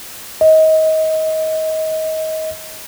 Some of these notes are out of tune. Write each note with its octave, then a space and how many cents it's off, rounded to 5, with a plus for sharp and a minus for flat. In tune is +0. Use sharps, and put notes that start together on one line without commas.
D#5 +25